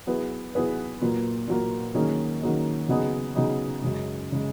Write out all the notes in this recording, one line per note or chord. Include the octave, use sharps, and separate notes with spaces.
F#3 B3 E4 G#4 B4
F#3 B3 E4 G#4 B4
A#2 F#3 A#3
A#2 F#3 A#3
D#3 F#3 A#3 C#4 G#4
D#3 F#3 A#3 C#4 G#4
C#3 F#3 B3 D#4 G#4
C#3 F#3 B3 D#4 G#4
F#2 C#3 G#3
C#3 G#3